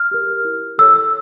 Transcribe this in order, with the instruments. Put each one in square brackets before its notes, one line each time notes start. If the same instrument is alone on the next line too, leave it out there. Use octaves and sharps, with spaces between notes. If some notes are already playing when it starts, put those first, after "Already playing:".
Already playing: [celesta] F6
G4 A#4
E4
A4 C#5 E6